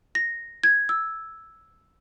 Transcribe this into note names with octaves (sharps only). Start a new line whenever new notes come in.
A#6
G#6
E6